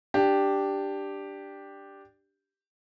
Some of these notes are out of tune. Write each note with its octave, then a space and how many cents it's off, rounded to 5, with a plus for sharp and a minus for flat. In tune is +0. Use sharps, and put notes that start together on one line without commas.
D4 +0 G4 +0